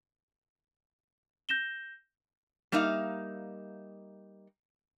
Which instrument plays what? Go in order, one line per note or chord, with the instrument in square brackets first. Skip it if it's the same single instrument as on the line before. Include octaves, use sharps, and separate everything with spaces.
[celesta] G6 A#6 E7 G7
[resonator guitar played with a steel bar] G3 A#3 D#4 E5 F5